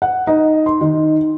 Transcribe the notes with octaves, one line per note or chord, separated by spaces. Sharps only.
F#5
D#4
C6
D#3